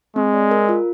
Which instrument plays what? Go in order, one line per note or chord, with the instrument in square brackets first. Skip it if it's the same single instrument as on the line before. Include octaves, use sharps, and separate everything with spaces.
[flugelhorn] G#3 [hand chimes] C4
[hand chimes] D5
A#4
F4